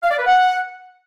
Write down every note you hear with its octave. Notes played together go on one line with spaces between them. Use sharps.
F5
D5
B4
F#5